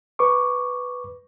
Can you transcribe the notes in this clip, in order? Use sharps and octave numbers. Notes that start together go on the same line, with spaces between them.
B4 C#6 D6